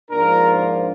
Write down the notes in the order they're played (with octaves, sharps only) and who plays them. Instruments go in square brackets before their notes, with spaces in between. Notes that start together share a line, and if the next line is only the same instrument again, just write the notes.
[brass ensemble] G#2 F3 A#3 D4 F4 A#4